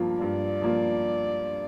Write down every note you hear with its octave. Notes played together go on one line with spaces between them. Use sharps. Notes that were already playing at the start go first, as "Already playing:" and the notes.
Already playing: G2 F3 A#3 F4
G2 D5
F3 A#3 F4